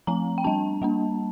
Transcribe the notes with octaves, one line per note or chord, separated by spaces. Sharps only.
F3 A3 C4 A#5
G5
G3 D4 A5
G3 A#3 D4